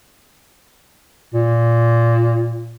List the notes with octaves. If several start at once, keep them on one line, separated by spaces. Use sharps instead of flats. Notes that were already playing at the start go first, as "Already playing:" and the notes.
A#2